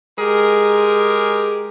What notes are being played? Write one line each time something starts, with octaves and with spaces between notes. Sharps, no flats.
G#3 G4 G#4 A#4